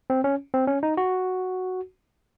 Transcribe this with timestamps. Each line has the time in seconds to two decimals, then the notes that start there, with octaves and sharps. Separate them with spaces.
0.10 C4
0.24 C#4
0.54 C4
0.67 C#4
0.83 D#4
0.97 F#4